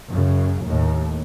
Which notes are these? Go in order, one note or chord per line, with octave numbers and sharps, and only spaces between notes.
F#2 C#3
D#2 A2